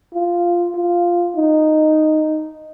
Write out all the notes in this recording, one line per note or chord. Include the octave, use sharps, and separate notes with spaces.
F4
F4
D#4